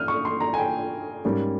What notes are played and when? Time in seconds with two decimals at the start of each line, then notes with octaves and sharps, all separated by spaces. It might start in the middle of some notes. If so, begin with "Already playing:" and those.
Already playing: G2 C#4 D#6 F6 G6
0.08 C#6
0.25 C6
0.40 A#5
0.54 G#5
0.58 G5
1.25 G#2 G3 A#3 C#4